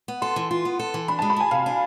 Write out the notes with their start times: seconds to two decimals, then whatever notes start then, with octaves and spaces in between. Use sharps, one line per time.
0.08 B3
0.22 A4 C6
0.36 E3
0.51 F4
0.65 B3
0.79 A4
0.94 E3
1.08 D4 B5
1.19 G#3 A5
1.30 B5
1.37 G#4 G#5
1.51 C3 F5
1.66 D4